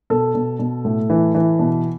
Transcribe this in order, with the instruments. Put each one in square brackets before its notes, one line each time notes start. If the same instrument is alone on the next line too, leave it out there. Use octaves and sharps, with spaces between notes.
[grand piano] B2 A4
B2
B2
A2
E3
E3
B2